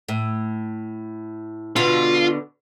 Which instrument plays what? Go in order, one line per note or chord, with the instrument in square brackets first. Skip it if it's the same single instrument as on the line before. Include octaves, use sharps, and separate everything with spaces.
[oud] A2
[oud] B2 D3 [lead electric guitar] F4